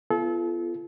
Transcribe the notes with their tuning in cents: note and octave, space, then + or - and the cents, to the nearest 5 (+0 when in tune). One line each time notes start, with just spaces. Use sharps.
B3 +0 F4 -30 A4 -35